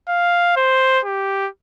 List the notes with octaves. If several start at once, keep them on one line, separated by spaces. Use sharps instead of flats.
F5
C5
G4